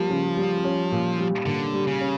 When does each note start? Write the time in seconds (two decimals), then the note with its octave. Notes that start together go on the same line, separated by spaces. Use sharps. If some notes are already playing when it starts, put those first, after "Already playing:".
Already playing: F3 G3 A#3
0.10 C#3
0.37 G3
0.65 C#4
0.92 A#2
1.19 G3
1.46 A#2 D3
1.74 G3
1.87 C#3
2.01 C#4